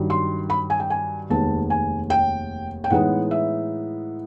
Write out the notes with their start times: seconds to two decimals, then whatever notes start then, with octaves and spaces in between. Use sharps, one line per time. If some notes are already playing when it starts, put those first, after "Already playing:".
Already playing: G2 D#3 F#3
0.10 C6
0.50 B5
0.70 G#5
0.80 G5
0.90 G#5
1.30 F1 D#2 D#3 G#3 B3 A5
1.70 G#5
2.10 G5
2.84 G5
2.90 A2 E3 G#3 B3 D#4 F#5
3.31 E5